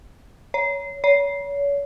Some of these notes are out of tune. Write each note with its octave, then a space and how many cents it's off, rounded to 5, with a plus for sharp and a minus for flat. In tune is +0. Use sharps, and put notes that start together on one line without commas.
C#5 +15
C#5 +35